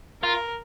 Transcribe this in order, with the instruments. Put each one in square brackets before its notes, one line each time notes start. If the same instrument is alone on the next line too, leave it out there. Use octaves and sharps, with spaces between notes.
[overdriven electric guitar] F4 [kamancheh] A#4